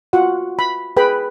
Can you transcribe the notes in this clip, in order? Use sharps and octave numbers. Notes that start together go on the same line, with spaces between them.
F4 F#4 F#5
B5
G#4 B4 G5 B5